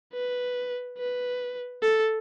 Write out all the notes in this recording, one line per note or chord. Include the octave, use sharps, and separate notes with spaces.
B4
B4
A4